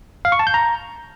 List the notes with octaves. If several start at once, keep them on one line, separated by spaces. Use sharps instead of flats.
F5
C#6
A5
G6
A#5